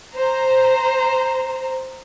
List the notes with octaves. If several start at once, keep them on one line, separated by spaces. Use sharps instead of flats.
C5 A#5